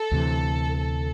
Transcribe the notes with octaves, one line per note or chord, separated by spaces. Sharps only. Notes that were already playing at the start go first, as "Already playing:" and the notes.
Already playing: A4
D2 C3 E3
A4